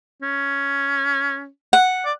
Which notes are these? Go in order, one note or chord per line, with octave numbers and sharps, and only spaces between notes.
C#4
F#5
D5